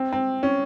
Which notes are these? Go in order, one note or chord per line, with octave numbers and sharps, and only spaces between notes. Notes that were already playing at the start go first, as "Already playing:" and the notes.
Already playing: C4
C4
C#4